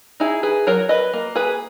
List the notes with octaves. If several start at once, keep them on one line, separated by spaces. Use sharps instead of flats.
D#4 E4 G#4
G#4 B4
F#3 A#4 C#5
B4 D#5
A#3
G#4 B4